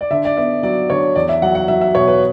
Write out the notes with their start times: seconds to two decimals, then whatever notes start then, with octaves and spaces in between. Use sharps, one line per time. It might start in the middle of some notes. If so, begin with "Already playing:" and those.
0.01 D5
0.10 D3 E5
0.25 D5
0.37 B3 E5
0.63 F#3 D5
0.90 D3 C#5
1.16 E2 D5
1.29 E5
1.42 F#3 F#5
1.55 F#5
1.68 F#3 E5
1.81 E5
1.95 B2 C#5
2.08 B4